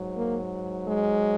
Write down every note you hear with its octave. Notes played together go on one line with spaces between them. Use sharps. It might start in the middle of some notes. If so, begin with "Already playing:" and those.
Already playing: G#2 F#3
A#3
G#3